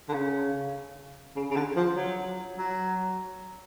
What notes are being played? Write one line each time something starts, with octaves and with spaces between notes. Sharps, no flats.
D3
C#3
C#3
C#3
D3
F3
F#3
F#3